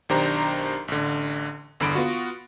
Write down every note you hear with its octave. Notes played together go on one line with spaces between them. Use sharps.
B1 D#3 D4 G4 C5 A#5
A1 D3
G1 E2 D3 B5 D7
B3 F4 F#4